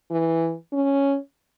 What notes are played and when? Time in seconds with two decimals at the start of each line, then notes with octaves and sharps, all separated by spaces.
0.11 E3
0.73 C#4